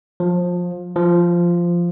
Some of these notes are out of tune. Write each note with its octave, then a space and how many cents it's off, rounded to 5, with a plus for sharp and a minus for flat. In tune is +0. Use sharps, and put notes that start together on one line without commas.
F3 +20
F3 -10